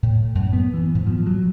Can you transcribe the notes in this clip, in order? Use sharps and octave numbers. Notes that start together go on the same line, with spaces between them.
A2
F#2
B3
E3
G#2
F3
F#3